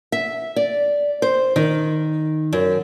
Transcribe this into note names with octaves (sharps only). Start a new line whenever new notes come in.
E5
D5
C5
D#3
F#2